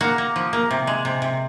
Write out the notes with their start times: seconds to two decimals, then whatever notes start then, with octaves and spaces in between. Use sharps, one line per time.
0.01 A#3 F#4
0.18 A#3
0.36 F3
0.53 A#3
0.71 C3
0.87 G#3
1.05 C3
1.22 C3